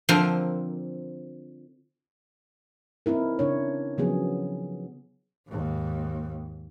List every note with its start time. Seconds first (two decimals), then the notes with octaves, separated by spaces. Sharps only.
0.09 D3 F3 C4 A#4
3.06 C4 D#4 E4 A#4
3.39 C#3 D4 C#5
3.98 C#3 F3 F#3 B3 G#4
5.47 D#2 G#2